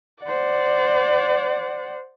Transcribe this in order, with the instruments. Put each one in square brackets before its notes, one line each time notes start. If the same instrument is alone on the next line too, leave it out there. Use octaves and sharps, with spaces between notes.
[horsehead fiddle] C5 F#5 [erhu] D5